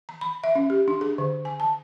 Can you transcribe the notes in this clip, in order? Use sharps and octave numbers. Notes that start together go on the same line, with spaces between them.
A#5
B5
E5
C#4
G4
D4
G#4
D3
G#5
A5